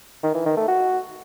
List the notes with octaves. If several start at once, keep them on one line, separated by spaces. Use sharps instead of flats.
D#3
E3
D#3
A3
F#4